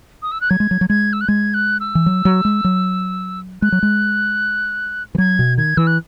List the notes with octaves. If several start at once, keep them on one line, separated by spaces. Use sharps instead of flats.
D#6
E6
F#6
F#3 G#6
G#3
F#3
F#3
G#3 G#6
E6
F#6
G#3 G#6
F#6
E6
E3
F#3
F#3
G#3
F#3
G#3 F#6
F#3
G#3
E3
F#3 G#6
B2
D#3 G#6
E3 E6
F#6